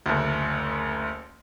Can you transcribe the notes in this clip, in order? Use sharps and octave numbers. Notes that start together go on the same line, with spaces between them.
F#1 D2